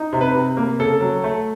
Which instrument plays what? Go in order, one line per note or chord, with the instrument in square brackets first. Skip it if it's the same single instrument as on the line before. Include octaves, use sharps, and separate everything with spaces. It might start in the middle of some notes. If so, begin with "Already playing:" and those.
Already playing: [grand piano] D#4
C3
B4
C3
A#3
C#3 A4
F#3
A3